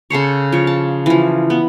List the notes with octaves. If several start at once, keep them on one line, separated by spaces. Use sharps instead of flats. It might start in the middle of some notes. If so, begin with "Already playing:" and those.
C#3 A4 C5 C#5
F3 C#5
A5
E3 F3
B3